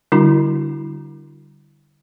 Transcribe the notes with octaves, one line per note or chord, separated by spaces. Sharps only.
D3 G3 D4 E4 F#4